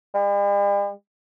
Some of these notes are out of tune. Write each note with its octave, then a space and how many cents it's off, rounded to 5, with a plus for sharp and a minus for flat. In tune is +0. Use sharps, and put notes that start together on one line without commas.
G3 +45